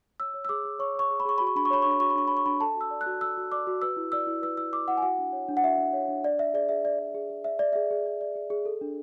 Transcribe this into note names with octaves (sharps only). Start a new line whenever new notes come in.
C#5 E6
C#5
E6
G#4 D6
G#4
C#5 C#6
C#5 C#6
G#4
B5
G#4 C#6
F#4 B5
C#6
D4 B5
C#6
C#5 B5
D4 C#6
B5
F#4 C#6
B5
D4 C#6
C#5 B5
C#6
D4 B5
A4 A5
F#4
E6
D5
F#6
F#4
A4 E6
F#4
D5 D6
F#4
B4 E6
E4
D5 E6
E4
B4 E6
E4 E6
D5 D6
E4 F#5
G#5
F#4 F#5
D4
C#5
D4
F#5
F#4 E5
D4
C#5
D4
D5
D5 E5
G#4 D5
G#4 E5
D5
D5
G#4
G#4
D5 E5
D5
G#4 E5
G#4
D5
D5
G#4
G#4
A4
D4